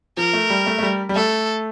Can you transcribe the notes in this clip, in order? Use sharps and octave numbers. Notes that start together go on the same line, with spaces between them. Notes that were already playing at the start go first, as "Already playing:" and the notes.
F3 A#4
A3
G3
A3
A3
G3
G3
A3 A4